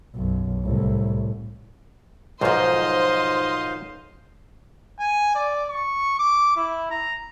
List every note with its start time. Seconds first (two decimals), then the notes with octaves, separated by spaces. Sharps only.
0.15 B1 F#2
0.62 C2 A2
2.41 B1 G#2 D#3 F3 C5 D#5 F5 C6
4.99 G#5
5.35 D5
5.70 C#6
6.19 D6
6.57 E4
6.90 A#5